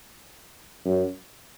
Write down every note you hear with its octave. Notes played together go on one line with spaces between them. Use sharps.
F#2